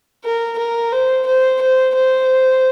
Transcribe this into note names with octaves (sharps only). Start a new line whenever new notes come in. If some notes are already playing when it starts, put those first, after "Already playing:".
A#4
A#4
C5
C5
C5
C5